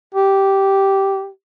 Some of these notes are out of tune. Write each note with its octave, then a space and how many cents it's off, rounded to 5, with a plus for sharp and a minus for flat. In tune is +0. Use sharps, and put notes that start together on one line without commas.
G4 -10